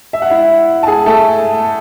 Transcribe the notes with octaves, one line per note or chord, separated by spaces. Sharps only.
E5
F#5
E4 E5
A5
G#4 G#5
A3 A4